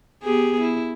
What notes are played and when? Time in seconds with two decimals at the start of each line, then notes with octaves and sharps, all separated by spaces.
0.23 B3 G4 G#4
0.61 E4